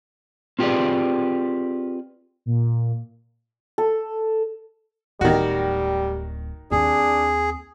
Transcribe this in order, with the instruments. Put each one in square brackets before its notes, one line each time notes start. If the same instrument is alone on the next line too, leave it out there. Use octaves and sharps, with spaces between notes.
[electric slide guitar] C4 F4 G4 G#4 B4 D5
[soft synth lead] A#2
[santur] A4
[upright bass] D1 [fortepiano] D#3 F#4 [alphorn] G3
[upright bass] D#2 C4 [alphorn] D4 [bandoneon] G#4